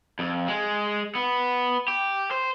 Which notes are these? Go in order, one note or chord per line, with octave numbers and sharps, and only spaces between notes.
F2
G#3
B3
G4
C5